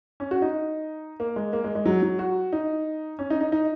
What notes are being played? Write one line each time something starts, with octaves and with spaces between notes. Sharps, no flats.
C#4
F#4
D#4
A#3
G#3
A#3
G#3
G#3
F#3
F#3
F#4
D#4
C#4
D#4
D#4
D#4